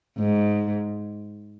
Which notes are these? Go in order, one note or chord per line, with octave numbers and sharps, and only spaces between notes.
G#2